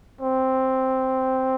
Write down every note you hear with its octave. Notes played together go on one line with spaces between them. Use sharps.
C4